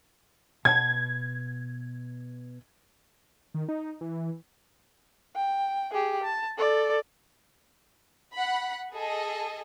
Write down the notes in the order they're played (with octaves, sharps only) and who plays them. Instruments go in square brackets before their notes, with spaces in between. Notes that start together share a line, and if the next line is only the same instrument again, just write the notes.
[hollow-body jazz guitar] B2 F#5 A5 [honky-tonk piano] G#6
[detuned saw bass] D#3
D#4
E3
[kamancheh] G5
G4 G#4
A5
A4 D5
[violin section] F#5 B5
G#4 A4 D#5